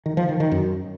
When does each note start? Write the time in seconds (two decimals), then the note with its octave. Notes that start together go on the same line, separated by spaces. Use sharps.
0.06 D#3
0.17 F3
0.29 D#3
0.40 D#3
0.52 F#2